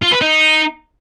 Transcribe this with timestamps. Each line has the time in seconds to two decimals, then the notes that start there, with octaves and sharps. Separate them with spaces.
0.02 F4
0.12 B4
0.21 D#4